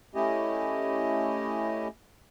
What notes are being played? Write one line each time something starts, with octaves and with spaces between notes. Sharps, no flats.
A3 C#4 E4 G4 D#5